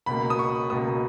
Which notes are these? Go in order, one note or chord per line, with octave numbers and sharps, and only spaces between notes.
C#2 B2 A#3 B5
D#6
C#6
C#2 B2 A#3 D#6